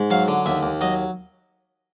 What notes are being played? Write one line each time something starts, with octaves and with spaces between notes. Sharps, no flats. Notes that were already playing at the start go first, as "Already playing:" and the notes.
Already playing: G#2
F#3 F5
D3
D#2 E5
D#2
F#3 D#5